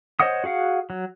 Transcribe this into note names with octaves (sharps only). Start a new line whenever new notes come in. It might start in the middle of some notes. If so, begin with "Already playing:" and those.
C5 C#5 D#5 F#5 D#6
F#4 G#4 F5 F#5
F#3